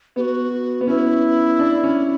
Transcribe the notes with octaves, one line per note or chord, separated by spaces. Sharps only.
B3 G4
F#4
B3
C#4 E4
D4
C#4